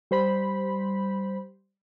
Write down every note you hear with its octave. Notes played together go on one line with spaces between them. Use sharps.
G3 C5 B5